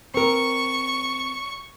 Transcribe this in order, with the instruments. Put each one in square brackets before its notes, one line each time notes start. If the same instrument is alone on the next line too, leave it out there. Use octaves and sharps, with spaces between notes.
[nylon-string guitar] C4 A#4 [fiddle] C#6